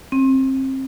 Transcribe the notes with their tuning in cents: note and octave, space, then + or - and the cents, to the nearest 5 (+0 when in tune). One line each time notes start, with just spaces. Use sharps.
C4 +30